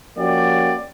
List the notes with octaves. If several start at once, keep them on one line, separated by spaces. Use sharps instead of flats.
F3 A#3 C#4 F#4 G4 D5